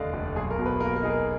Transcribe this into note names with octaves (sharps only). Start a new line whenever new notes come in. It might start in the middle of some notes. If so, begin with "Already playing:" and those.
Already playing: F1 D#2 D3 D5 D#5 F5
F1
B1 G#4
A#4
B2
B4
A#3 A#4
A#4
D#4 G#4
A#4